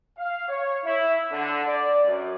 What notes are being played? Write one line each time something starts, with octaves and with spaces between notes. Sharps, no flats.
F5
C#5
E4
D3
D5
F#2